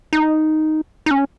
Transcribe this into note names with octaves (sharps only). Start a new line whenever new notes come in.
D#4
D#4
C#4